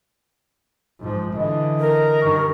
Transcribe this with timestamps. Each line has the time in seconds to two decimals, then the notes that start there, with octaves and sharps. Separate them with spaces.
0.99 G#2 F3
1.35 D3 E3 D#5
1.80 A#4
2.22 G2 D#3 C#6